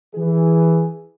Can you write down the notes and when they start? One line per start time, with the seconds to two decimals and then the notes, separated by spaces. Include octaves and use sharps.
0.15 E3 G#4